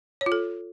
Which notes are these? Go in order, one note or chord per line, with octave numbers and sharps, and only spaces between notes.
C#5
F4
A4